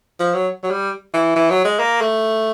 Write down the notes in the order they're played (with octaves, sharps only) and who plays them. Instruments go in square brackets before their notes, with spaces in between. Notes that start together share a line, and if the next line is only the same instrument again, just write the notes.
[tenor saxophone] F3
F#3
F#3
G3
E3
E3
F#3
G#3
A#3
A3